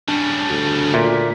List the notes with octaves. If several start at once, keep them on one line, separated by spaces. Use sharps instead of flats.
C#3 G3 D4
D2
A#2 E5